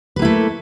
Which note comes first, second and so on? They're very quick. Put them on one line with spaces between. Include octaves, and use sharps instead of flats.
B4 A#3 E4 A3